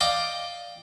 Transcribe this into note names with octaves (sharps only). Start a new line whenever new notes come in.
D5 D#5 F5 G5 D6